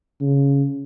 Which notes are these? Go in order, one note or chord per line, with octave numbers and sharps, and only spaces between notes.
C#3